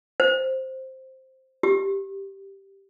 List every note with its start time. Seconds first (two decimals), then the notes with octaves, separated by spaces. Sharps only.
0.20 C5
1.63 G4